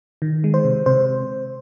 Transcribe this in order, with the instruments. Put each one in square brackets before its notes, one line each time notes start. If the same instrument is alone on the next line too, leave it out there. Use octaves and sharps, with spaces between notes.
[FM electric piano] D#3
G#3
C5
C3
C3 C5